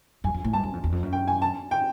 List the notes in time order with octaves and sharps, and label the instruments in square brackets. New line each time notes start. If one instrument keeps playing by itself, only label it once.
[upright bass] F#2 [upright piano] G#5
[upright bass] F2
A2
[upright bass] G2 [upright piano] A5
[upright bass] F#2
F2
E2
F2
F#2
[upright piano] G5
G#5
A5
G5